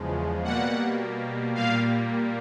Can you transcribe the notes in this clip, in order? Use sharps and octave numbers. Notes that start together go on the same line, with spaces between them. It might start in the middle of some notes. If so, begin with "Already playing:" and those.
Already playing: E2 C#3 F3 G#3
B2 G3 A#3 F#5
A#2 G3 A#3 F5